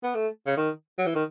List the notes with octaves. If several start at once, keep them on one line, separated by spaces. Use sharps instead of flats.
B3
A3
C#3
D#3
F#3
E3
D#3